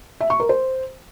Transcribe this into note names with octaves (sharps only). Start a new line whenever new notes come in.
E5
C#6
A#4
C5